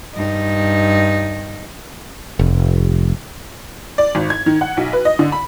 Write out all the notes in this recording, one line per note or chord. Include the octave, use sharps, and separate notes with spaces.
G2 D#4
F1
D5
G#1
G#6
D#3
F#5
B1
B4
D#5
D3
B5